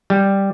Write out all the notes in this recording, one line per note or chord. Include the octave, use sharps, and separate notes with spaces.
G3